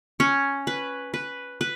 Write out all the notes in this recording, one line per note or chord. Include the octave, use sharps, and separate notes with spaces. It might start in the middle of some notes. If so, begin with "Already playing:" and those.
C#4
B4
B4
B4